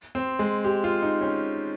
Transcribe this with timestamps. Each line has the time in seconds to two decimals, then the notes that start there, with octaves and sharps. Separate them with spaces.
0.15 C4
0.39 G#3
0.64 G4
0.84 F4
1.02 D#4
1.21 C#4